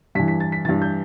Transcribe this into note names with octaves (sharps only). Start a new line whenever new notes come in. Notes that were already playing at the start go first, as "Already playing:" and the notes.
G2 E3 B6
B6
A6
B6
G2 E3 A6
G6